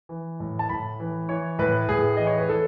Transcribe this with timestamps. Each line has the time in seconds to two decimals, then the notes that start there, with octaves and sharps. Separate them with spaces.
0.09 E3
0.40 A2
0.59 A5
0.69 A2 B5
1.00 E3
1.29 E3 C#5
1.59 A2 B4
1.88 A2 G#4
2.17 E3 D#5
2.27 C#5
2.38 B4
2.48 E3 A4